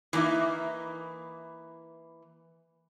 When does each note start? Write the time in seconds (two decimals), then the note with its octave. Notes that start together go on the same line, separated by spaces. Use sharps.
0.13 E3 F#3 A#3 D#4 E4